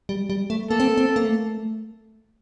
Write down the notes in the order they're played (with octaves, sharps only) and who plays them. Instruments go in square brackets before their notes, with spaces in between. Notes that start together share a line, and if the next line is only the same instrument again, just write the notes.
[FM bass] G3
G3
A3
[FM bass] A#3 [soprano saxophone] A4
[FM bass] C4
A#3
C4
A#3
A3